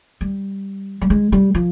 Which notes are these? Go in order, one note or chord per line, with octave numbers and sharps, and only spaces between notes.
G3
G3
G#3
G3
F3